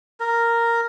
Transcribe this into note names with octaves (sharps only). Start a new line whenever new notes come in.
A#4